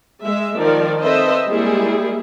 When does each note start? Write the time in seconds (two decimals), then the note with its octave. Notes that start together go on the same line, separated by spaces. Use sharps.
0.22 G#3 E5
0.60 D#3 F3 A#4 D5
1.01 C4 A4 B4 C5 D#5 E5
1.48 G3 G#3 A#3 E4 G#4